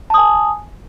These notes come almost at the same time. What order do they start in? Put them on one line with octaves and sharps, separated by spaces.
A5 D#6 G#5